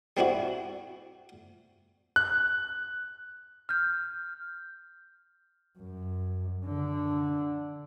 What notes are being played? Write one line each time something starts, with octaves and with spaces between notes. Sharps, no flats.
G3 C4 D4 E4 F#4
F#6
F6 G6
F#2
D3